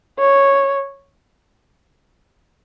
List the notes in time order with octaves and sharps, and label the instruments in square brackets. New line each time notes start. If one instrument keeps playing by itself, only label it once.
[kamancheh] C#5